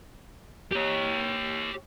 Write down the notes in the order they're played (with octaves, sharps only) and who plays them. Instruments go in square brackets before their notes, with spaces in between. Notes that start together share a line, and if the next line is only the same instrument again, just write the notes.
[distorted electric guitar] G4 C#5